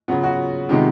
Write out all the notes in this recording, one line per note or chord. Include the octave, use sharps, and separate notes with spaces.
C#3 F#3 B3 F4
F#4
C3 D#3 G#3 B3 F4 G4